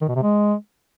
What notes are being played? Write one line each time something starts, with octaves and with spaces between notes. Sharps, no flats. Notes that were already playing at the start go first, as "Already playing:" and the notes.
D#3
B2
C3
G#3